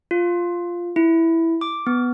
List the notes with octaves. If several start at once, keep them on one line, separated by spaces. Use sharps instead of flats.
F4
E4
D6
B3